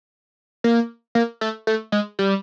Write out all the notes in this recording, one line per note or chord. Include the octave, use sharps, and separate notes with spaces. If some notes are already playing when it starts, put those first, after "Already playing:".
A#3
A#3
A3
A3
G#3
G3